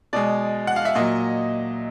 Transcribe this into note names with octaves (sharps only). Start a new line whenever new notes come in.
B2 G#3 D5
F#5
F5
E5
A#2 F#3 D#5